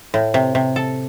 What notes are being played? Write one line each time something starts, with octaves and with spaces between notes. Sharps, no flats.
A2
C3
C3
A4